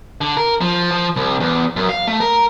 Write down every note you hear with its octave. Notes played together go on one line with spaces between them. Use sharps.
D3
A#4
F3
F3
C2
E2
F#2
F5
A3
A#4